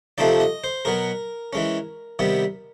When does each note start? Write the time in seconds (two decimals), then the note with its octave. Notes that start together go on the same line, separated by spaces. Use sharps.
0.18 C3 F3 A3 C4 D#4 D5
0.40 D#5
0.64 C5
0.85 B2 F#3 B3 A#4
1.53 E3 G#3 C#4
2.19 C3 D#3 G3 B3